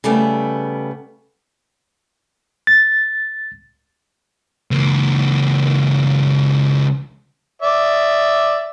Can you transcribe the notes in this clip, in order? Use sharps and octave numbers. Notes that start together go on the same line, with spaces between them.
C#3 G3 A3 B3
A6
C#2 A#3
D5 E5